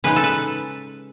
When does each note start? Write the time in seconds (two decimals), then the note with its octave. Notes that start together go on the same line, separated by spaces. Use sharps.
0.04 C#3 G#3 D#4 B4
0.16 A4
0.24 B4